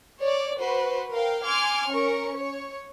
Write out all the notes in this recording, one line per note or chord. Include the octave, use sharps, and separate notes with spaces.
C#5 D5
F#4 B4 C5
A#4 F5 G5
G#5 C6 D6 F6 G#6
C#4 A#4 C#6
C#5